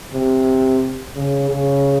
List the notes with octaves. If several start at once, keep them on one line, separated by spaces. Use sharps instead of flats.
C3
C#3
C#3